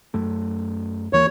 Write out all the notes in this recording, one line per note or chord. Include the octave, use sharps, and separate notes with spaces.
F#2 A3
D#2 E3 A#3 C#5